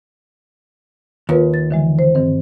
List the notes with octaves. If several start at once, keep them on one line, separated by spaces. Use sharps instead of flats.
D#2 F4 A#4 B4
A6
D3 E3 G#3
C5
G2 D#3 C4